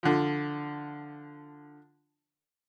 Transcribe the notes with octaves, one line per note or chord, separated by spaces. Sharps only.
D3 F3